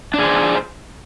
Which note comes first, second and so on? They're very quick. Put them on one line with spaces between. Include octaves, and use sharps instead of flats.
D4 G#4 C5